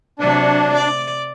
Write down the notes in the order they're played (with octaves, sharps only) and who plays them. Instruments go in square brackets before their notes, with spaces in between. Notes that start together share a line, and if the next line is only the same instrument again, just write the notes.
[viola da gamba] C3 F#3 [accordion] D4
[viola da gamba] D5